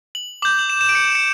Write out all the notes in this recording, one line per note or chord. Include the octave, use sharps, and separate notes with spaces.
F#7
D6 G6 F#7
F#7
E7
E7
D7
C#7
C#7